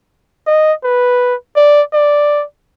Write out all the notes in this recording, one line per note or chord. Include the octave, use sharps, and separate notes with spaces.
D#5
B4
D5
D5